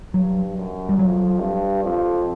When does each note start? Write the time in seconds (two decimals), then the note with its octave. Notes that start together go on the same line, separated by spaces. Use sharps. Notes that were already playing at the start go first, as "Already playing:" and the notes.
0.14 G2 F#3
0.56 F#2
0.89 G3
0.99 F2 F#3
1.41 G2
1.84 F2